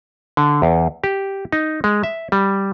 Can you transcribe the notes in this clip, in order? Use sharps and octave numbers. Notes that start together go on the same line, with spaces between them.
D3
E2
G4
D#4
G#3
E5
G3